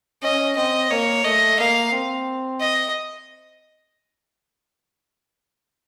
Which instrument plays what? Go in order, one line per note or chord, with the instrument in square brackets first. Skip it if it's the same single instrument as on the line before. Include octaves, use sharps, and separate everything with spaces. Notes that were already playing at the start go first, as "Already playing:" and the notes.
[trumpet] C#4 [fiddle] D#5
[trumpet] C4 [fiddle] D#5
[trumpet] A#3 [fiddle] C#5
[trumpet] A3 [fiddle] D#5
[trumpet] A#3 [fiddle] F5
[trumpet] C4
[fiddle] D#5